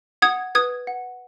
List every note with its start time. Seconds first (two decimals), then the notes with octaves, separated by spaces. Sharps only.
0.22 F#5 D#6 G#6
0.55 B4 D#6 G#6
0.87 F#5